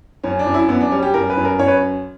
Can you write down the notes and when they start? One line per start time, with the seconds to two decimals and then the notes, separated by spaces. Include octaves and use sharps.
0.24 F#2 C#4
0.39 D4
0.46 F#2
0.54 E4
0.69 F#2 B3
0.81 D4
0.91 G3 C#4
1.02 G4
1.14 F#2 A#4
1.30 B4
1.37 F#2
1.45 A#4
1.59 F#2 C#5
1.68 B4